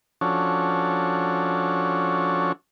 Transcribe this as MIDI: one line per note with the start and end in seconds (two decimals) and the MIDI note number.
0.21 2.52 53
0.21 2.52 61
0.21 2.52 62
0.21 2.52 66
0.21 2.52 69
0.21 2.52 73